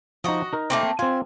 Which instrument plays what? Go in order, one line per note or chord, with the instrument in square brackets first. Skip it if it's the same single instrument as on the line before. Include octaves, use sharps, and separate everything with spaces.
[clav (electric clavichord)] F3 D#4 [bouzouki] F#4 D#5
[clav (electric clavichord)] D#4 A#4
[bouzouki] A3 A#3 C4
[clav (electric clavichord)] C4 F4 [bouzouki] G#5